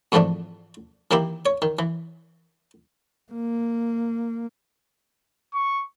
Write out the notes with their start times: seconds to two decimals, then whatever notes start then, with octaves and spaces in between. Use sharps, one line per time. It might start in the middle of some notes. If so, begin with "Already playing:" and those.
0.12 F2 G#2 E3 F3 A3 D4
1.11 D#3 E3 A#3 E4 G4
1.46 C#5
1.62 D#3
1.79 E3
3.32 A#3
5.54 C#6